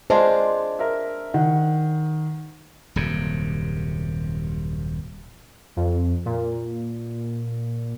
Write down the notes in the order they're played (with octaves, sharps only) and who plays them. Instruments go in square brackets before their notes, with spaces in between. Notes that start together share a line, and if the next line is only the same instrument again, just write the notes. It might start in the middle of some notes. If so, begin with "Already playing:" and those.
[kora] G#3 D4 F4 [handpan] C5
[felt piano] A#4 E5
[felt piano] D#3 [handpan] F#5
[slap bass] D#1 F#2 C3
[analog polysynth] F2
A#2